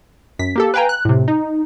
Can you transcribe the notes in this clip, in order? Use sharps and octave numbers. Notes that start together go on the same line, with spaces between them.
F#2 B6
A#3 G4 A4
B4 F5 G5 G#5 A#5
F#6
A2 C3
D#4